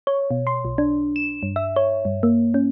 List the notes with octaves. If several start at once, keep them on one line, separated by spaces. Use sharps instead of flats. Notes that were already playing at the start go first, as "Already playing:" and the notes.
C#5
B2
C6
B1
D4
E7
G2
E5
C#5
G2
A#3
C#4